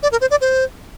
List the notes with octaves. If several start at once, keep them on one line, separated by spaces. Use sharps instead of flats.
D5
A#4
C5
D5
C5